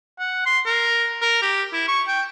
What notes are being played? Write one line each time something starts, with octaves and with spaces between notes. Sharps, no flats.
F#5
C6
A#4
A#4
G4
E4
C#6
G5